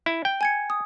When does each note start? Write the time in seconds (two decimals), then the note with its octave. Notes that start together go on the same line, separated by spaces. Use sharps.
0.06 E4
0.25 G5
0.41 G#5 G#6 C#7
0.70 D#6